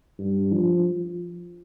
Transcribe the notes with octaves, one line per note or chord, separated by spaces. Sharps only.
G2
F3